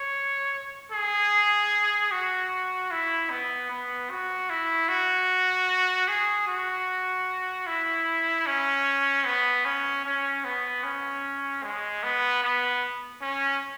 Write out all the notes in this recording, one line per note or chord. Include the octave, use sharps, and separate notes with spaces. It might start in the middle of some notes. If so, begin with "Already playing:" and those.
Already playing: C#5
G#4
F#4
E4
B3
B3
F#4
E4
F#4
G#4
F#4
E4
C#4
B3
C#4
C#4
B3
C#4
G#3
B3
B3
C#4